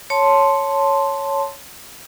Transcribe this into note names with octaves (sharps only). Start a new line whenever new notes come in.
C#5 A5 C6